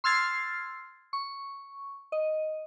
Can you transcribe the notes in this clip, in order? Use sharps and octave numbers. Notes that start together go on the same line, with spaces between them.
C6 E6 F6 G#6 A6 C7
C#6
D#5